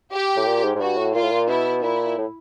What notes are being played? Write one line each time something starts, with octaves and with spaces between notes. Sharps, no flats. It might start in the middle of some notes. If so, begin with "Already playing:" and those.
G4
A2
A#2
G#2
G#2
G2 F#4
A2
A#2 F4
A2
A#2
B2 E4
A#2 E4
A2